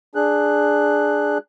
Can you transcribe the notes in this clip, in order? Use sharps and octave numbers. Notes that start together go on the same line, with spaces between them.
D4 G#4 F#6